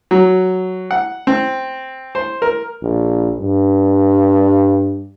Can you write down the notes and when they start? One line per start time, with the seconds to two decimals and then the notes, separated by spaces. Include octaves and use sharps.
0.11 F#3
0.91 F#5
1.27 C4
2.15 C5
2.42 A#4
2.82 A#1
3.40 G2